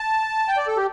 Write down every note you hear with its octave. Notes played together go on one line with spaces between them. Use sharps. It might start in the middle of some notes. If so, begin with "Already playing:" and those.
Already playing: A5
G5
D5
A4
G4